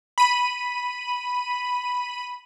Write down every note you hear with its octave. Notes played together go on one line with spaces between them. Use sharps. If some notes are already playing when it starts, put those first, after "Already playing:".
B5 D#7